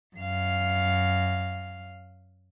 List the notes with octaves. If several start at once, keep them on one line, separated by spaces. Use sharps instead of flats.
F#2 F5